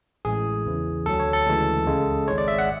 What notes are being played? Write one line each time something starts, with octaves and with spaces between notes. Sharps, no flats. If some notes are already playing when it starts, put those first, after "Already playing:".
A1 A2 G#3 G#4
E2 C#3 E3
D2 D3 F#3 A4
C#5
A4
D2 C#3 E3 G#3
C#2 C#3 G#3
G#1 G#2 G#3 C#5
D5
E5
F#5